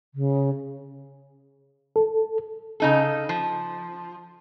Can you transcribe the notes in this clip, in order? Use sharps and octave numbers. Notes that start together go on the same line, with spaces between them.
C#3
A4
C#3 D#4 A4
F3